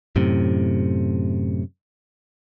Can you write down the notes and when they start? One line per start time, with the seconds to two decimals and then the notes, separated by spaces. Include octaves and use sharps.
0.16 F#2 A2 C3